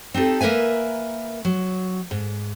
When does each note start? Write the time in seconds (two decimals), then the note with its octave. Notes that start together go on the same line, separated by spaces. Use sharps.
0.14 C4 D#4 G4 A4
0.41 A#3 A#4 B4 E5 G#5
1.45 F#3
2.11 G#2